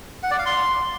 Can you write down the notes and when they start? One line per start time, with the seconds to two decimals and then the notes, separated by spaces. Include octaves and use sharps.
0.23 F#5
0.31 D5
0.38 F5
0.46 C6